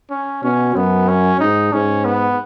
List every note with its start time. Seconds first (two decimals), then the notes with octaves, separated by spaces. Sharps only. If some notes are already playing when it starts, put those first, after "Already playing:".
0.10 C#4
0.44 B2 C#4
0.75 F#2 B3
1.09 C#4
1.40 G#2 D#4
1.73 G#2 C#4
2.05 B3